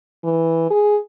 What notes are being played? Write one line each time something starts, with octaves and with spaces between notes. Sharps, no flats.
E3
G#4